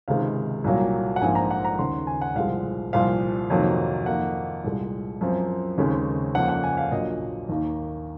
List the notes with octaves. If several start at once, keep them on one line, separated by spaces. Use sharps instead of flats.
C#2 C3 D#3 G#3 F5
C2 A#2 F#3 A#3
F#5
A#1 G#2 F3 A#3 G#5
A#5
F#5
A#5
D#2 C#3 F3 C6
G#5
F#5
C2 A#2 F3 G#3 F5
C2 A#2 F3 F5
F2 C3 D#3 F#3 A#3
F2 D#3 A#3 F#5
C2 A#2 G#3
F#2 F3 C4
D#2 C#3 G#3 C4
F2 C#3 F3 A#3 F#5
F#5
G#5
F5
A#1 A#2 F#3 A#3 D#5
D#2 D#3 A#3